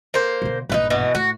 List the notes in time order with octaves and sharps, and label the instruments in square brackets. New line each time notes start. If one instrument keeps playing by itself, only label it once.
[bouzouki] A#3 C5
[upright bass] B2 D3
[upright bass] A#1 G2 [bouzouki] D#4 F4 B4
[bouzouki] B2 E3 F#4
[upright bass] A2 [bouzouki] F#4